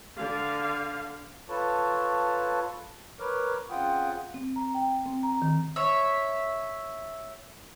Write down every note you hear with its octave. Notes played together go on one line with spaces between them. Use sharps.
D3 F5
F4 A4 B4 C#5 A5 C#6
A#4 B4 C#5 D6 F6
C#3 C4 F4 F#5 G5 D#6
C4
A#5
G5
C4
A#5
D#3
C#5 E5